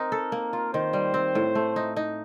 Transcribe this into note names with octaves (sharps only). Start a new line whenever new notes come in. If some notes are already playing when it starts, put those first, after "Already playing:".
Already playing: C4 D#4 A#4
A4
A#3
F4
D#3 C5
G3
C4
A2
A3
D#4
D#4